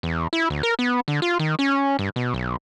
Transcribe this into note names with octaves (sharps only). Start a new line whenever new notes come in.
E2
E4
D2
A#4
B3
D3
F4
D#3
C#4
G2
B2
B1